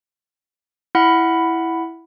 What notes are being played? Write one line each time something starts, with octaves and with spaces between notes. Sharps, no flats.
E4 F#5 B5